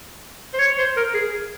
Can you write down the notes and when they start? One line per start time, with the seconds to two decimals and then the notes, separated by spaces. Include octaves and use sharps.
0.54 C5
0.59 C#5
0.78 C5
0.97 A#4
1.14 G#4